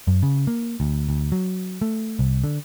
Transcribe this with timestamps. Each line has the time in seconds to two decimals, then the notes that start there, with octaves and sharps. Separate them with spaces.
0.07 F#2
0.23 C#3
0.47 A#3
0.80 D2
1.09 D2
1.32 F#3
1.82 A3
2.19 C2
2.44 D3